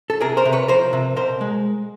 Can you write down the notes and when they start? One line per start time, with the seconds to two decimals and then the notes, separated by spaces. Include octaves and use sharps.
0.10 A4
0.20 C3 G#4 A#4
0.37 A#4 C5
0.45 C3
0.52 B4 C#5
0.68 F3 A#4 C5
0.93 C3
1.16 B2 A#4 C5
1.41 G#3